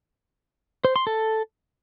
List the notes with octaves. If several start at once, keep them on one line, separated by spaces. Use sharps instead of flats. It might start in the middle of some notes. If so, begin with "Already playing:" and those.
C5
C6
A4